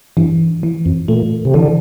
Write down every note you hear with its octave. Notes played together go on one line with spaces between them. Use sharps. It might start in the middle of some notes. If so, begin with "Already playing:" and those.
G2 E3
E3
F2
A#2 A3
C3
D3 E3